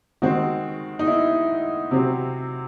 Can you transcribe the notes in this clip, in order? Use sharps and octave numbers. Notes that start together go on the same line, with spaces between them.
D#3 G#3 C4 F#4
D#4
E4
C3 F#3 C4